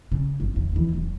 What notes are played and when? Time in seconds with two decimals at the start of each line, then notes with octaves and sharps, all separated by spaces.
0.12 C#3
0.40 G1
0.54 D1 D#2
0.72 D#2 E3
0.94 D1 E2